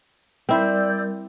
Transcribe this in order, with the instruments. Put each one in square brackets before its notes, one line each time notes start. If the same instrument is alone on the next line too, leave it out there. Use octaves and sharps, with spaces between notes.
[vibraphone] G3 A#4 [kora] C4 E4 [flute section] D5 E6 G6